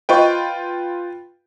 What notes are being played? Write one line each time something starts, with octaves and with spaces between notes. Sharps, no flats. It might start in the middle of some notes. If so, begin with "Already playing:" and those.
F4 B4 C5 D#5 G5 C#6